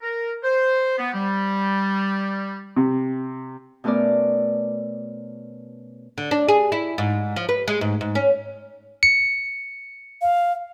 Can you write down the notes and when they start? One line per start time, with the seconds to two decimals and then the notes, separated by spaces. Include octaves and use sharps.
0.02 A#4
0.44 C5
0.98 B3
1.13 G3
2.76 C3
3.84 B2 A3 B3 C#4 A#4 D5
6.18 D3
6.31 D4
6.48 G#4
6.72 E4
6.98 G#2
7.36 F3
7.49 B4
7.68 G#3
7.81 G#2
8.01 G#2
8.15 C#4
9.03 C#7
10.22 F5